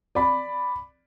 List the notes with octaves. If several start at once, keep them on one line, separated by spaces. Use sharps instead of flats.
D5 B5